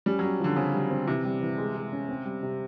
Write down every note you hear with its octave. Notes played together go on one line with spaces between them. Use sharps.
G3 C#4
F#3 C#4
D3 F3
C#3 C4
G3
C4
C3 E3
G3
E3
G#3
G#3
C#4
C4
G3
C3